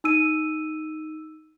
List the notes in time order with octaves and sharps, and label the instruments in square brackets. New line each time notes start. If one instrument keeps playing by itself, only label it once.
[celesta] D#4 E6 D#7